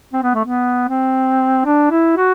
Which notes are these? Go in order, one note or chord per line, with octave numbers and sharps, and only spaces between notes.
C4
B3
A3
B3
C4
D4
E4
F#4